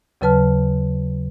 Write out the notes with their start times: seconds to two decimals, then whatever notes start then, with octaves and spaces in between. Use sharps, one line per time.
0.21 D#2 C#3 F#3 B4 A5 F6